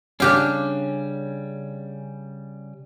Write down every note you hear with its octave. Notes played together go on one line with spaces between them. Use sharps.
C#3 G3 C#4 D4 G4 F5